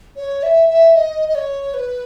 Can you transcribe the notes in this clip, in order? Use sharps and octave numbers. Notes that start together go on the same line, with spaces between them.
C#5
E5
E5
D#5
D#5
C#5
B4